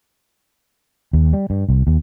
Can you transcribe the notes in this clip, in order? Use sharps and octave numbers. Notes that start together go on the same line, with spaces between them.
D#2
G3
G2
C2
D#2